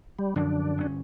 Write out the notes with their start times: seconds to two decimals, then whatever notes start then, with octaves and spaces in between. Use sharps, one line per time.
0.19 G3
0.36 F#2 D3 F3 D4
0.78 G1 C#4